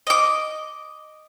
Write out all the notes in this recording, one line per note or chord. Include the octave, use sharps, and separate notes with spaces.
D#5 D6